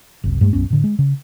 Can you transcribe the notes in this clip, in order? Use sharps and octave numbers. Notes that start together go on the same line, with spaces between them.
F#1 C2
G2 G#3 A3
B1 F#2 B3 C#4
A2 D3
G#3
C#3